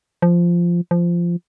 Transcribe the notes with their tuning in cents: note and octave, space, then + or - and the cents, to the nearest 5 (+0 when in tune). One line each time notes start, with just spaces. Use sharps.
F3 -10
F3 -15